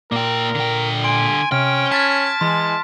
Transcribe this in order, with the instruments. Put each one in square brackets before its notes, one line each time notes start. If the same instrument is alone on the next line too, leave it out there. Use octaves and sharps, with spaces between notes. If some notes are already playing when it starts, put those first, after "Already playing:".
[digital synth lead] A#2 [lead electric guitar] A#3 G5 [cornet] A#4
[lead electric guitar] D3 G5
[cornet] G#5 [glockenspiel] C6 D7
[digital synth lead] C3 [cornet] C#4 [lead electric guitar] G5 [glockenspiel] F6
[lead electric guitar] A5 [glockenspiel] F6 A6 B6 [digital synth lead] G#6
[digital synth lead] E3 [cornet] G#3 [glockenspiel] C6